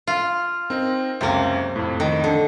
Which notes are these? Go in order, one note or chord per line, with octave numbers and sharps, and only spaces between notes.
F4
C4 D#4 A#4
C#2 F#2 C3 A#3
F2 A2
D#3
D3